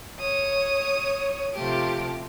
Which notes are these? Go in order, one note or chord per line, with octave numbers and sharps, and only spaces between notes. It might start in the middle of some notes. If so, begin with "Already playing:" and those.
C#5 D#6
C3 F3 A3 G4